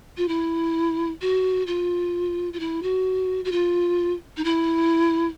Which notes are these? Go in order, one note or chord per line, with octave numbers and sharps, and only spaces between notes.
F4
E4
F#4
F4
F4
E4
F#4
F#4
F4
D#4
E4